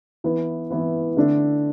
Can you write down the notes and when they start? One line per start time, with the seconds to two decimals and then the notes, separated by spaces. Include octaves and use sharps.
0.24 E3 B3 E4 B4
0.71 E3 B3 E4 B4
1.17 D3 A3 D4 A4